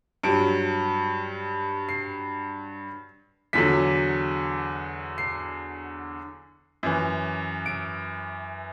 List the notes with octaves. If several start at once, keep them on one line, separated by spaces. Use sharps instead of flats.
G2 F#3 D7
C7
E2 D3 F#3 B6
C7
F#2 E3
D7